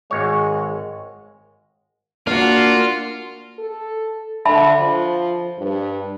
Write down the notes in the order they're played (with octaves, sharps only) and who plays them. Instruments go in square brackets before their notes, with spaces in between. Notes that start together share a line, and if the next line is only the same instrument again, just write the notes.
[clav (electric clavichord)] G#1 C#5 [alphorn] G#3
[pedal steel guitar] A#3 D4 F5 [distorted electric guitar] F4 [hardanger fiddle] F#4
[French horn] A4
[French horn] D3 [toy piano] E5 A5 B5
[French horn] F3
G2